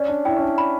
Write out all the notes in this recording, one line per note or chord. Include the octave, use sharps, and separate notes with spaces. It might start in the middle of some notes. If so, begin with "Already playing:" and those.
Already playing: C#4 D5
D4
E4 G5
C#4
D4
B5